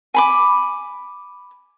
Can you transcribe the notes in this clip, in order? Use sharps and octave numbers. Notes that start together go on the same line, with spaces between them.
G#5 B5 D6